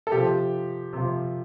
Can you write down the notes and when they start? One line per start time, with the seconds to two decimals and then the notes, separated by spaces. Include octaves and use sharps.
0.07 A4
0.11 C3 F3 G4
0.93 C3 F3